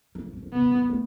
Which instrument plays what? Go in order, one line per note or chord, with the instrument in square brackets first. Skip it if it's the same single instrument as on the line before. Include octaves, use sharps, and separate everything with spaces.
[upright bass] E3
F3
G3
F3
[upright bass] C3 [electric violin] B3
[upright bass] C#3
F#3
G3
A3